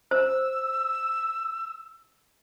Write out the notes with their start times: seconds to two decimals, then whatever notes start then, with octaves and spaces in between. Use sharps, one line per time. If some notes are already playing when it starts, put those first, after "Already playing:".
0.11 C5 E6